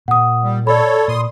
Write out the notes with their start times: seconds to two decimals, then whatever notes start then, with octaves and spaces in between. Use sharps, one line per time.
0.08 A#2 F#5 D#6
0.43 G3
0.67 A4 C#5 D5 B5
1.08 A#2 C6 D#6